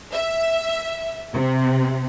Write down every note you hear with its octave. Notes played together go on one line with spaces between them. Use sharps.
E5
C3